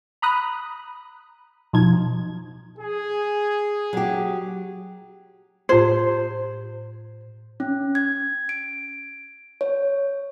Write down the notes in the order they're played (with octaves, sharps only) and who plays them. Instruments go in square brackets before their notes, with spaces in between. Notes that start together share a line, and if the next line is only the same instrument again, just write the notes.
[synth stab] A#5 B5 D#6 F#6
B2 F3 D#4 G#6
[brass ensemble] G#4
[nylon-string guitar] F#3 G4
[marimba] A2 F4 G#6 [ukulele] C5
[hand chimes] C#4
G#6
D7
C#5